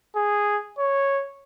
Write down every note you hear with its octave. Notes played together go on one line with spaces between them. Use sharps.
G#4
C#5